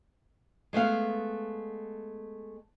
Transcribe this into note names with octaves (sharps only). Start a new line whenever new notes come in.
G#3 A3 B3 F5